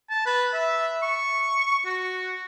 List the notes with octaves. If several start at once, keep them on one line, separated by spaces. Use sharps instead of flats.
A5
B4
E5
C#6
F#4